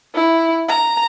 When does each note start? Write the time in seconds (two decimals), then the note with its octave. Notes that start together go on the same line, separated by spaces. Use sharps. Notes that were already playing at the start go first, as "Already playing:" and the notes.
0.15 E4
0.69 A#5